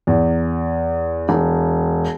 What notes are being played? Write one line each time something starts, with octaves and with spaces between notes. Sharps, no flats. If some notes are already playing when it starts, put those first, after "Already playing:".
E2
E1